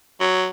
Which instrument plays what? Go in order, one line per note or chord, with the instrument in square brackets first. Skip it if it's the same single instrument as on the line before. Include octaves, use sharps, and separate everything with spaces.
[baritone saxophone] F#3